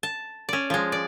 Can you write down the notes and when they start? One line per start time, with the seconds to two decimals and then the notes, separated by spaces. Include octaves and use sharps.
0.03 A5
0.49 C#4 D5
0.70 F3 G#3
0.92 D5